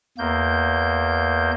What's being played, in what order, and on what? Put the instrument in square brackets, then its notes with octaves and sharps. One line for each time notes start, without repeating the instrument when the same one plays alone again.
[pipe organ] E2 A#3 G6